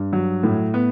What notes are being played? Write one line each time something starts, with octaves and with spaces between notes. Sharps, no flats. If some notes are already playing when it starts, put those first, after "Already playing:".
Already playing: G2
F#3
A2
B3